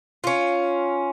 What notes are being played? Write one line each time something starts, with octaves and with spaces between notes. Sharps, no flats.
C#4 F4